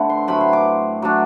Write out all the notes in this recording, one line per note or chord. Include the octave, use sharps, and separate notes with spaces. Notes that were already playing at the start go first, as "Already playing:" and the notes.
Already playing: D3 A3 C4 E4 F#5
C6
A2 F#3 A3 C4 B5
C6
D6
F#3 A3 D4